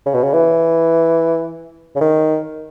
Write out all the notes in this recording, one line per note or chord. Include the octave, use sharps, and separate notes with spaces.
C#3
B2
C#3
E3
C#3
D#3